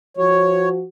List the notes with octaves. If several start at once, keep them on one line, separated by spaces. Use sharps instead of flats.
F3 F#4 C#5